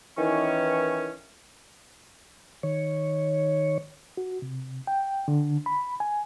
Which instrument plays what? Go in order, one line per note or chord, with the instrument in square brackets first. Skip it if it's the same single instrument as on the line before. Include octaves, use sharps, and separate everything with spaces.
[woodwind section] D#3 E3 C#4
[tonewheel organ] D#3 C#5
[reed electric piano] F#4
C3
G5
D3
B5
G#5